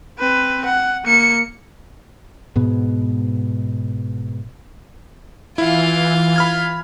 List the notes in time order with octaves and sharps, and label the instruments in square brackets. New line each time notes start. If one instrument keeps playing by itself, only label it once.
[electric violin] C4 B4
F#5
A#3 C#7
[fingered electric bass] G#2 B2 B3
[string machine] E3 [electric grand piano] E4 [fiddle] F4 F5
[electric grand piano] B5 F6 G#6